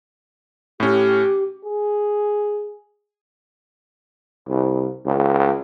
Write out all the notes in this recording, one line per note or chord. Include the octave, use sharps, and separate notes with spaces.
A2 C#4 G4
G#4
C2
C#2